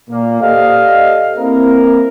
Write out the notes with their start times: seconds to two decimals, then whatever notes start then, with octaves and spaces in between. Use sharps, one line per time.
0.10 A#2 A#3
0.42 G4 A4 C5 D5 D#5 F5
1.38 A#3 C4 E4 A#4